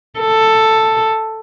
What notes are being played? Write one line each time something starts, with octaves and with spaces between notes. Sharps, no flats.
A4